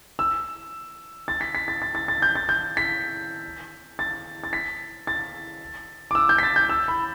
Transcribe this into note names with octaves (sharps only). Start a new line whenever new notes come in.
E6
A6
B6
B6
A6
A6
A6
A6
G6
A6
G6
B6
A6
A6
B6
A6
D6
E6
G6
B6
A6
G6
E6
B5